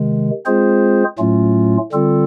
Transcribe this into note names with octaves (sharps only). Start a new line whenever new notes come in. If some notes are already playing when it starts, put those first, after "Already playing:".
Already playing: C3 D#3 G#3
G#3 C4 F4 G#4 C5
A2 F#3 A3 C#4 F4
D3 G3 C4 F4 A4